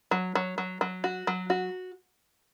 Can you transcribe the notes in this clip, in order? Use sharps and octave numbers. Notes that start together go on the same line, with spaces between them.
F#3
F#3
F#3
F#3
F#4
F#3
F#4